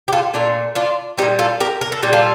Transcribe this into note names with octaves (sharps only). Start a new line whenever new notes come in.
G4
F4 A4
A#2 A3 D4 F4
D4 F4
A#2 G3 D#4 G4
F4 A4
G4 A#4
A#4
A4
A#2 G3 G4
F4 A4